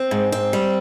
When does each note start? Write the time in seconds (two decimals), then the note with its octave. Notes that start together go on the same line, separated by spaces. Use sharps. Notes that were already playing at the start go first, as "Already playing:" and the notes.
Already playing: C4
0.11 G#2
0.32 C4
0.53 G3